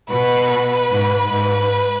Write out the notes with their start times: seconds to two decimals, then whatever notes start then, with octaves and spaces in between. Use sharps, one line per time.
0.10 B2 B4
0.50 B4
0.90 G#2
1.30 G#2 B4